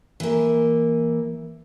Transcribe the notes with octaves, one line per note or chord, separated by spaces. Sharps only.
E3 A#3